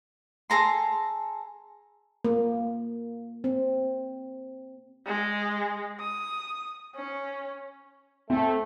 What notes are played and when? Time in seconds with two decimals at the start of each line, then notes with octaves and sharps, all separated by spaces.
0.50 G#4 A4 A#5 C6
2.25 A#3
3.44 C4
5.07 G#3
6.00 D#6
6.95 C#4
8.30 A3 C4